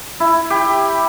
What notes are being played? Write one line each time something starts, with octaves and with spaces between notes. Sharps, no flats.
E4
G4